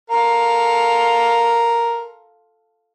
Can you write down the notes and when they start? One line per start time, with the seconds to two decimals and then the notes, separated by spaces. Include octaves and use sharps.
0.10 F4 A4 A#4